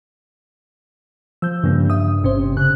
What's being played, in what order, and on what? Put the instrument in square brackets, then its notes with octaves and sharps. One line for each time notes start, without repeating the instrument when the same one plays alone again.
[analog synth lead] F3 [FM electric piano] E6 G6
[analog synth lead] G2 [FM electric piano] C#3 G3 A#3
[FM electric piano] E5 D#6
[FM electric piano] G1 C#4 C5 [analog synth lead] C3
[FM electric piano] C#3 [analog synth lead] F#6